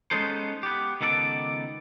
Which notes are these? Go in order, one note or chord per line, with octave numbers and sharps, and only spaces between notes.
G#3 B3 C#4 D#4 A4 C5
B3 G4
C#2 D#3 B3 A4 A#4 D5